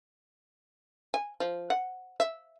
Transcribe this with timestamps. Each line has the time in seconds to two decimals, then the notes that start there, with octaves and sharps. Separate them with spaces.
1.14 G#5
1.40 F3
1.70 F#5
2.20 E5